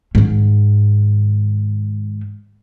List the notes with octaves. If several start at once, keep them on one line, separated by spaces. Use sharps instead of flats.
G#2 D#3